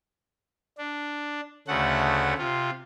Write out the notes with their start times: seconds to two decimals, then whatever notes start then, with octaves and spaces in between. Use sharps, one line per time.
0.78 D4
1.68 D2 C#3 A3 F#5
2.38 C3 F4